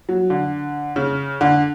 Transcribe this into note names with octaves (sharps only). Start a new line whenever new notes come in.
F#3
D3
C#3
D3